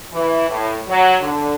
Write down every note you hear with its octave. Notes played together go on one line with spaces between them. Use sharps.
E3
A2
F#3
D3